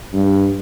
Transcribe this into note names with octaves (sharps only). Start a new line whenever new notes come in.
G2